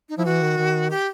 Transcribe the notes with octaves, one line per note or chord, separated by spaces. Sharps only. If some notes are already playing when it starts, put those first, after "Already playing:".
D#4
F3 E4
E3 F#4
D#3
D#3
G4